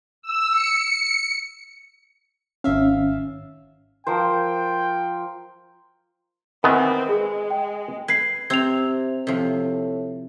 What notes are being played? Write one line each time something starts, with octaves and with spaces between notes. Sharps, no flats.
E6
C#7
G#1 C#4 E5 F5
F3 A#4 C5 G5
D#3 E3 B3 C4 B4
G#3 G#4
G5
B4 G#6 C7
C3 C4 G#6 F7
A2 C3 F3